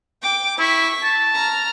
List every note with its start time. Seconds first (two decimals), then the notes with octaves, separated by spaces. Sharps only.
0.22 G5 D6
0.59 E4 C#6 B6
1.03 A5
1.34 A#5 F6